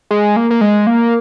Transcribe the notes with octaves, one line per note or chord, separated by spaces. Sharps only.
G#3
A#3
A#3
G#3
A#3